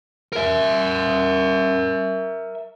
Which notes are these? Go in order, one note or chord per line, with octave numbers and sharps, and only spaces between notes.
A#4 E5